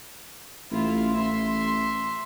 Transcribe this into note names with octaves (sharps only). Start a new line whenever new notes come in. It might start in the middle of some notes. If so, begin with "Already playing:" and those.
A1 E4 F4
A1 E5 C6